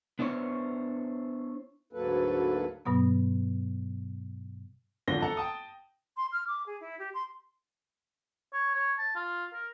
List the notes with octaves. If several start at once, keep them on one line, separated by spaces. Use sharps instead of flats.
B3 D4 E4 C5 C#5
D2 G#2 F#3 A#3 A4 B4
G2 B2 F#3 B3
G#1 D3 F3 D4 A#6 G7
A4 F#5 A5 A#5
G5 A5 D#6
C6
F6
D6
G#4
E4
G4
C6
C#5
C#5
A5
F4
A#4